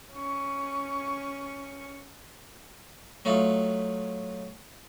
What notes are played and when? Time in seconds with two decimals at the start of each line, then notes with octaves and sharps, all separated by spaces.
0.12 C#4 C#6
3.25 F#3 A3 D#4 F4